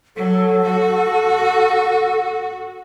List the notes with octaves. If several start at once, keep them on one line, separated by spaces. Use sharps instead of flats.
F#3 A4
F#4